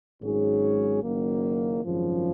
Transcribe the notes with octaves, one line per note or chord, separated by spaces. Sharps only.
G#1 G#2 F#3 C#4 G#4
F#1 F#2 D#3 F#3 A#3
G#1 F#2 C#3 F3